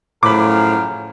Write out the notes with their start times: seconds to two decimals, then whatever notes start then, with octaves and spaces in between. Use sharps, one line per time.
0.23 F#2 A2 C#3 F3 A#4 B5 D6